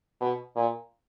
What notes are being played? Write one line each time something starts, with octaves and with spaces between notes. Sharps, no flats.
B2
A#2